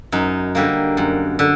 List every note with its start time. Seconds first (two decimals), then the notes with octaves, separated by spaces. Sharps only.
0.12 F#2 D#4
0.55 D3 G3 A#3
0.97 F#2
1.39 D3